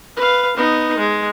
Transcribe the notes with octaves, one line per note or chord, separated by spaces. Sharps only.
B4 F5
B3 D#4
G#3